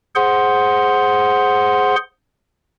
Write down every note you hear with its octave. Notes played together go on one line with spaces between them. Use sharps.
G#4 C5 F#5 C6